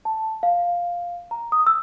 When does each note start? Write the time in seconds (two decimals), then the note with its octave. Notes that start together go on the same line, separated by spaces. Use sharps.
0.05 A5
0.43 F5
1.31 A#5
1.52 D#6
1.67 E6